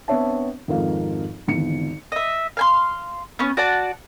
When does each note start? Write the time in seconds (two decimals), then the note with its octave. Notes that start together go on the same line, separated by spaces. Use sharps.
0.08 B3 C4 D4 C#5 E5 A5
0.68 G#1 F2 G#2 F4 A#4 F5
1.48 G#1 E2 D3 C#7
2.12 D#5 E5
2.57 F5 G#5 C6
3.39 B3 C#4
3.57 F#4 D5 F#5 A5